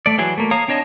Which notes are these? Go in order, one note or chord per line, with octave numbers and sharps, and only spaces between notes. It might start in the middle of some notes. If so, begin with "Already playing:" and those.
A3 D5
E3 F#3 G#4
A3 A#3
C#5 F5 A#5 D#6
C4 D4 C#5 D#5 A5